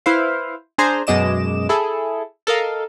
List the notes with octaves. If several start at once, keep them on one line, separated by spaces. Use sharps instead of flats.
E4 B4 C5 F5
D4 G#4 C5 G#5 A#5
F#2 B2 G#3 D#5 D6 E7
E4 G#4 A4
A4 A#4 D#5 F5